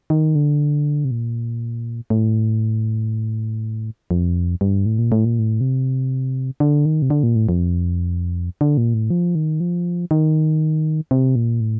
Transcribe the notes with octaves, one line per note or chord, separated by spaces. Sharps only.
D#3
D3
C3
A#2
A2
F2
G2
A2
A#2
A2
A#2
A2
C3
D3
D#3
C3
D3
A#2
A2
F2
D3
A#2
A2
F3
D#3
F3
D#3
C3
A#2
A2